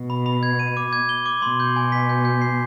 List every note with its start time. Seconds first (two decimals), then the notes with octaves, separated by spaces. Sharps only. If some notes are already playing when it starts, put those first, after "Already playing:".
Already playing: B2
0.10 B5
0.26 B5
0.43 G#6
0.59 D#7
0.77 D6
0.93 G#6
1.09 G7
1.26 D6
1.42 B2 C6
1.60 G6
1.76 G#5
1.92 B6
2.09 G6
2.25 G6
2.42 C7